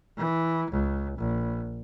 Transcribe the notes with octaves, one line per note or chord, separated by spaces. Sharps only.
E3
C#2
A#1